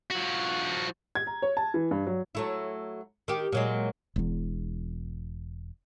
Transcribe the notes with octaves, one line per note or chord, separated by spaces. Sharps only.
F3 F#4
G#6
A#5
C#5
A5
E3
G2
F#3
F#3 A3 E4
D#3 G4
A#2 F#3 G#3
E1 E2